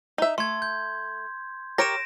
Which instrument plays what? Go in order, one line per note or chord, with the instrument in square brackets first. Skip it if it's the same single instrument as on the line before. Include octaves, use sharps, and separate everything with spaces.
[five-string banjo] D#4 E5
[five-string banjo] A3 [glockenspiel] C6 G#6
[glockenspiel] G6
[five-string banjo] G4 A#4 C#5 [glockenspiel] A#6 D7 E7